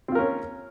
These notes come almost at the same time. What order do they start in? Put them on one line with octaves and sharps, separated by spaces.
C4 F4 A#4 C#4